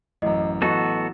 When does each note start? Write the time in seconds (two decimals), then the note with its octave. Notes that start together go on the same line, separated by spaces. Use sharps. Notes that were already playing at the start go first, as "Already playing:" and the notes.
0.22 A1 F#2 D#5
0.62 A1 F#3 B3 F#4 A4 D#5 C#6